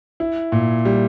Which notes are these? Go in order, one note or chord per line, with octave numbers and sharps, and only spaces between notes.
E4
A#2
G3